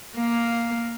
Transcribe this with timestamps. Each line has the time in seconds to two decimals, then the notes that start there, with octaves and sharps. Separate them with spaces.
0.16 A#3 F5